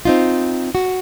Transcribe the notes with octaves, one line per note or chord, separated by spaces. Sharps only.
C4 D#4 F4
F#4